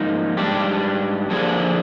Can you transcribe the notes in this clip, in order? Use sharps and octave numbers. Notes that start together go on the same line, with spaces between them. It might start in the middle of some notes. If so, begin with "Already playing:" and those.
Already playing: G#2 F3 A#3 D#4
G#2 G3 D4 G4
D3 F3 A#3 D4 G#4